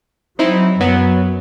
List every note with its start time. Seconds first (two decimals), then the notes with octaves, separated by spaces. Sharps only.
0.39 F#3 C4 D#4 E4
0.81 F#2 F#3 B3